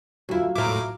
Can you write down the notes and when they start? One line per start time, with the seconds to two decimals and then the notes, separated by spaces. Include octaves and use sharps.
0.29 D2 F#3 E4 F4
0.56 A2 E4 A#4 D6